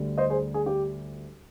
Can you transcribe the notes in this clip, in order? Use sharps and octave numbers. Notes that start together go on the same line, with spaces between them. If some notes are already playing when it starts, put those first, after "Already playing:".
Already playing: D2 D3 G3
C5 D#5
G#4 C5
G#4
G4